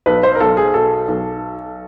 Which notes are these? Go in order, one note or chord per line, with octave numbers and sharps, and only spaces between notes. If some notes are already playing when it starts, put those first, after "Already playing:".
B1 B4
C5
A#4
B1 A4
G#4
B2 A4
B1